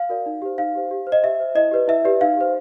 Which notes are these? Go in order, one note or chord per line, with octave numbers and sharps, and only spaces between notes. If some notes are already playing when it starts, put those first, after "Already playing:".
Already playing: F5
F#4 A#4 D5
D#4
G4 C5
D#4 F5
G4 C5
G4
C5
D#5
G4 E5
C5
E4 D#5
G4 B4 D5
E4 E5
G4 B4 D5
D#4 F5
G4 C5